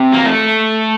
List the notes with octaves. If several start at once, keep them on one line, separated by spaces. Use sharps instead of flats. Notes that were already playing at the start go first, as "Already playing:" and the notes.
Already playing: C3
A#3
A3